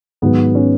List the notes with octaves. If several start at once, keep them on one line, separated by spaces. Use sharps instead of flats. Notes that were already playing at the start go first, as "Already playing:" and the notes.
G#2 D#3 F#3 B3
C#4